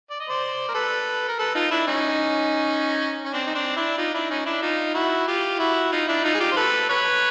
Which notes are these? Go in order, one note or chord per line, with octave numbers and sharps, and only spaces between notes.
D5
D#5
C5 D5
A#4
A4 B4
A#4
A4 B4
D#4 F4
D4 E4
C#4 D#4
C#4
C4 D4
D#4
C4 D4
D4 E4
D#4 F4
D4 E4
C#4 D#4
D4 E4
D#4 F4
E4 F#4
F4 G4
E4 F#4
D#4 F4
D4 E4
D#4 F4
G#4
F4 G4
C5
A4 B4
B4 C#5